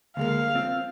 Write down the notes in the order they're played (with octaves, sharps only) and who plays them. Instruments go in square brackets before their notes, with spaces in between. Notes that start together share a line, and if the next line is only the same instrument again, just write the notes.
[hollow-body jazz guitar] D2 G#3 A#3 [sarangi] F5
[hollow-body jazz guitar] C4 F4